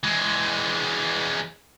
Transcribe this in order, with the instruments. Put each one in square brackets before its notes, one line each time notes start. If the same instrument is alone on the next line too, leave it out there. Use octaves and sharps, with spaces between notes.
[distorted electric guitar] E3 G#3